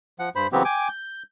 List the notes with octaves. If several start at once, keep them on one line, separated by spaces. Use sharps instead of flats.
F3 F#5
G2 C5 B5
C#3 E3 F#3 B3 C4 G4
G5 G#5 D6
G6